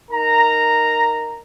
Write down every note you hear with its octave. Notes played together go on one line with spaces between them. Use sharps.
D#4 A#4 A#5